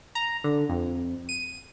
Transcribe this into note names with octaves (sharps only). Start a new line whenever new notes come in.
A#5
D3
F2
D#7